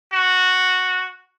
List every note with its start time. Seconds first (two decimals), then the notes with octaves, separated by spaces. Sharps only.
0.13 F#4